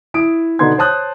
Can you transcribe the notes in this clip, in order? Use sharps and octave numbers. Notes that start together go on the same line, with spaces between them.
E4 D#6 D7
B2 D3 B3 D#4 C6 G#6
C5 C#5 A5 D#6 F#6 G6